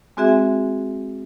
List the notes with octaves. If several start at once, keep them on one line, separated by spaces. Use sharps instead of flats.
G#3 C4 F#4 G#4 E5